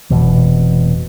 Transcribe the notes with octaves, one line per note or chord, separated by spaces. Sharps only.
F1 C#2 B2 E3